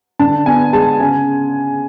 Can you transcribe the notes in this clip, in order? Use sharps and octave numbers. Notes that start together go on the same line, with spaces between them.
D3 A5
B3 G#5
G#3 A5
C#3 G#5